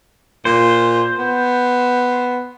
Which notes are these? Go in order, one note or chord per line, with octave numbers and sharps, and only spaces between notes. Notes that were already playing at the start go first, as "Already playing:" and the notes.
A#2 C5
B3